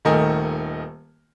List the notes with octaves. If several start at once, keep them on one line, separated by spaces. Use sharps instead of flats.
D#1 D#3 A3 A#4 D#5 G#5